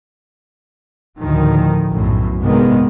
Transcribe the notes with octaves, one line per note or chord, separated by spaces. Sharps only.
D2 A2 D#3 F3
B1 F#2 A2
G#2 C3 D#3 G#3 B3